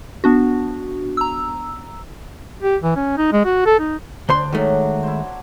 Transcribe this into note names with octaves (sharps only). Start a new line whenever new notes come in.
B3 D4 F#4
A#5 E6
G4
E3
C#4
D#4
G#3
F#4
A4
D#4
D2 D4 C5 C6
D#3 F#3 G#3 A3
E4 C5